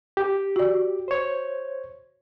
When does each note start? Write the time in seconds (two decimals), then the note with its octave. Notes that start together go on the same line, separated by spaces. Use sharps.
0.17 G4
0.56 F#4 D5
1.08 C5 C#5